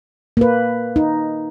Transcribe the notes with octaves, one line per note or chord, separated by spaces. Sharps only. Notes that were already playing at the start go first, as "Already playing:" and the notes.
A#3 B4
D#4